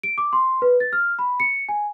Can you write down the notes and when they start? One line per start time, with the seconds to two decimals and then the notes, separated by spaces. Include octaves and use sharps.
0.03 D7
0.18 D6
0.33 C6
0.62 B4
0.80 A6
0.93 F6
1.19 B5
1.40 C#7
1.69 G#5